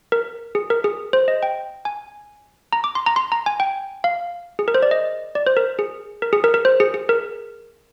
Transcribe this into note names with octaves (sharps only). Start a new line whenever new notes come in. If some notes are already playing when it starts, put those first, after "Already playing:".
A#4
G#4
A#4
G#4
C5
D#5
G5
G#5
A#5
D6
C6
A#5
C6
A#5
G#5
G5
F5
G#4
A#4
C5
D5
D#5
D5
C5
A#4
G#4
A#4
G#4
A#4
A#4
C5
G#4
G#4
A#4